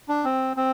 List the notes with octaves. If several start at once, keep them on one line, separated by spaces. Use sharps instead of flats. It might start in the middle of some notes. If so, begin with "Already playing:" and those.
D4
C4
C4